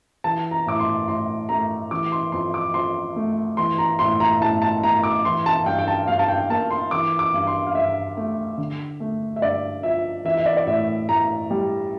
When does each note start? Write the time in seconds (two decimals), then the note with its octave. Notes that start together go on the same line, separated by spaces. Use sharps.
0.24 E3 A5
0.51 A#5
0.66 A2 D6
0.80 C6
1.08 A2 C6
1.49 A3 A#5
1.91 E3 D6
2.12 C6
2.32 F2 C6
2.54 D6
2.74 F2 C6
3.16 A3
3.57 E3 C6
3.78 A#5
3.99 A2 C6
4.20 A#5
4.41 A2 A5
4.62 A5
4.83 A3 A#5
5.03 D6
5.25 E3 C6
5.46 A5
5.66 G2 G5
5.79 G5
5.88 A5
6.08 G2 F5
6.19 A5
6.28 G5
6.49 A#3 A5
6.71 C6
6.91 E3 D6
7.19 D6
7.34 G2
7.47 C6
7.67 F5
7.75 G2 E5
8.17 A3
8.58 D3
9.00 A3
9.36 E5
9.41 G2 D5
9.83 F3 E5
10.25 E3 E5
10.37 E5
10.46 D5
10.57 D5
10.67 A2 E5
11.09 A2 A#5
11.50 G3